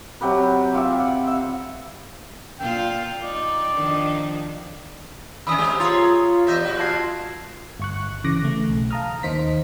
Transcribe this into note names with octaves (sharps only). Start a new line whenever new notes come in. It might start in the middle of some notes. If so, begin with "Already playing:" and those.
C3 F#3 G4 B4
F4 G4 E5
F#5
E5 F5
A#2 F4 G5
D#4 D5
D#3 F3 D4
D#3 C4 C#4 G#5 B5 D#6 E6
G#2 G#3 G4
F4 G#4 C#5 A#5 C6 A6
E2 G4 D#5 E5 G6
A#2 F#4
F4 A5 G#6 C7
G1 C#6 F#6
C#3 E3 D6 F#6 A#6
C#3 A3
B1
F5 A5 A#5 D#6 F6
D#2 D#3 D#4 C5 B6